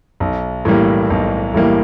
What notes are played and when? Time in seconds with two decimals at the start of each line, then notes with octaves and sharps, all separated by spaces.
0.20 B1
0.65 A2 E3 G3 A#3
1.10 B1
1.54 A2 E3 G3 A#3